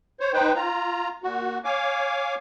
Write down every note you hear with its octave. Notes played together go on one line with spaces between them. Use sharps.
C5 C#5
D#4 B4 C5 G5
F4 A#5
A#2 F#4
C#5 F5 G#5 D6